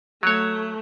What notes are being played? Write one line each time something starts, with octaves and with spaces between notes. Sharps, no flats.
F#3 A3 C#5